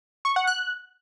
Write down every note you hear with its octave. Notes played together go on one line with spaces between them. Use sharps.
C#6
F#5
F#6